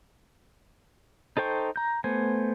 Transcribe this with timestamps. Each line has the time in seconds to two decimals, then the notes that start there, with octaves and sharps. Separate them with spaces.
1.37 D#4 A4 C5 G5 C#6
1.76 A#5 G6
2.04 A3 B3 C5 G#5